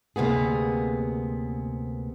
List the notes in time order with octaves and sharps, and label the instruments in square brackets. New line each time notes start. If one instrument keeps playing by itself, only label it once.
[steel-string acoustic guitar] D2 C3 A#3 B3 G#4